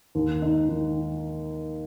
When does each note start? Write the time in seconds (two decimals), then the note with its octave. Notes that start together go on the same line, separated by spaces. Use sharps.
0.15 D#2
0.42 D#4
0.69 D#3